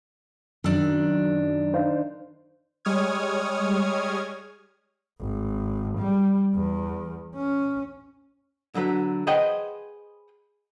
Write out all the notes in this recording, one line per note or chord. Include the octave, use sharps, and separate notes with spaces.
F#2 D#3 D4 E6
D#4 C5 F5
G3 G#3 C#5 D#6 F6 G#6
G#1
G3
E2
C#4
D3 F#3 B4
G#4 B4 C5 D#5 F#5 G5